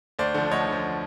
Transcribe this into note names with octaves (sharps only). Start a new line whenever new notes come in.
D2 C5 D5
D3 F3
D2 C#5 D#5
D3 F3